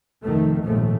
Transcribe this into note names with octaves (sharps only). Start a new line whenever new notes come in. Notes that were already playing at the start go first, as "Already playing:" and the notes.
F1 D#3 A3
A#1 D#2 G#2 F3 A3